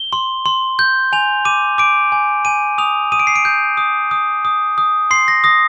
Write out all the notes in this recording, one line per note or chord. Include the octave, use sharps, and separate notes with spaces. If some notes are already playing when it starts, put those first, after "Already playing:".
Already playing: G7
C6
C6
G6
G#5 F7
D6 D#7
D6 D7
G#5
G#5 D#7
D#6 F7
D#6 D#7
D7
C7
D7
G6
D#6
D#6
D#6
D#6
C6 C7
A#6
D#6 A#6